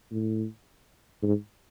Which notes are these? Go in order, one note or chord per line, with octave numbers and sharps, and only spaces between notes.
A2
G#2